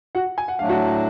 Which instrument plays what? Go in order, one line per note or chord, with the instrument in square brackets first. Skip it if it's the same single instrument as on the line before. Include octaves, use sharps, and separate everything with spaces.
[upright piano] F#4 F#5
G#5
F#5
[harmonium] A2 F#3 A3 D4 [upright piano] F5
[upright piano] F#4 F#5